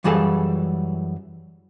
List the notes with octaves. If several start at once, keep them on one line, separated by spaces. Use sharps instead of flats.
F#2 E3 G3 G#4 A4 F5